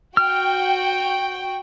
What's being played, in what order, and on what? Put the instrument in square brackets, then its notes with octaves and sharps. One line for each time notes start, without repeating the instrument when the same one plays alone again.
[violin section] F#4 G5 [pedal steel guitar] F6